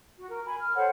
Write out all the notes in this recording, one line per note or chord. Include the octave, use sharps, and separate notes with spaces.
F#4
A#4
G#5 B5
F6
A4 C5 C#5 F#5